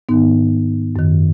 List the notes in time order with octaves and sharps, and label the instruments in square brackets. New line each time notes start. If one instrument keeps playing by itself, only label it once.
[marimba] G#2 D#3 B3 D#4
F#2 D#3